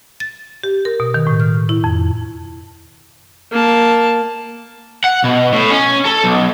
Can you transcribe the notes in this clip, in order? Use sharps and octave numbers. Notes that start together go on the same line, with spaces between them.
A6
G4
A#4
B2
D#3
A2
F6
E4
F2
A#3 A5
F#5
B2
A2
C#4
A4
B1